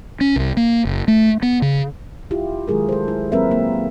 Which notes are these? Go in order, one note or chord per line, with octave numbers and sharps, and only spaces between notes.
C#4
C2
A#3
F#1
A3
B3
C#3
E4 F4 G4
D#3 F#3 G#3 G#4 A#4
A4 C5
E4
F#3 A#3 C4 A#4 B4 E5
A#3